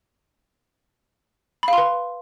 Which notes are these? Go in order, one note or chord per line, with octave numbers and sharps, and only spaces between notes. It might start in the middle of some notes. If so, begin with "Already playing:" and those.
B4 F5 B5 C6